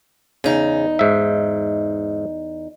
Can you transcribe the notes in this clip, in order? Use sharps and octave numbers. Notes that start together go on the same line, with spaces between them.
E2 C#3 D#4
G#2 E5